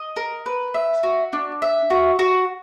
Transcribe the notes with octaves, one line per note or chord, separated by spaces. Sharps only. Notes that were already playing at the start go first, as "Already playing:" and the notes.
Already playing: D#5
A#4
B4
E5
F#4
D4
E5
F#4
F#4